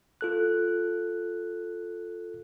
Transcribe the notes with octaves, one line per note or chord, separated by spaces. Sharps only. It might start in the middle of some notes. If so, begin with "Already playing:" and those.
F4 A4 F#6